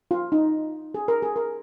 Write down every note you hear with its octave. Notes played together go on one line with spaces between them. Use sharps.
F4
D#4
G#4
A#4
G#4
A#4